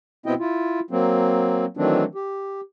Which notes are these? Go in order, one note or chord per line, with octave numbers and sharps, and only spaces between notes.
B2 B3 C4 E4 D#5 G5
E4 F4
F#3 A#3 C4
D#3 E3 F#3 A3 C4 D4
G4